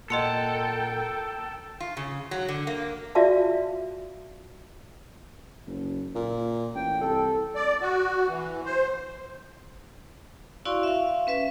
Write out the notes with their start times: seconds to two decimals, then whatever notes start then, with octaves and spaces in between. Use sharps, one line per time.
0.10 A#2 A4 A#4 D#5 F#5 G5 C6 C#7
1.80 F4
1.97 C#3
2.31 F#3
2.48 D3
2.67 A#3
3.15 F4 F#4 D5 E5 F5 A5
5.67 F#1
6.15 A#2
6.75 A1 G5
7.01 C2 A4
7.55 D5
7.81 F#4
8.28 E3
8.65 C5
10.65 E4 F#4 D5 F5 C6 C#6
10.83 E5 F5
11.27 C#4 B4 E5